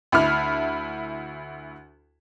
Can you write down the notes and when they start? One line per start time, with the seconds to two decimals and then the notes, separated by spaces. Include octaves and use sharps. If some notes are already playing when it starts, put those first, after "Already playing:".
0.12 D2 E4 B5 F6